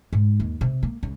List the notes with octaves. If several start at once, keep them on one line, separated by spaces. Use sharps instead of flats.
G#2
D#2
C3
A#3
C#2